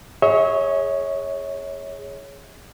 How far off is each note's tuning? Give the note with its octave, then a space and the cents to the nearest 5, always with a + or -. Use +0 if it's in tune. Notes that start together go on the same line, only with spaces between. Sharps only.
G#4 +0 C#5 +0 E5 -45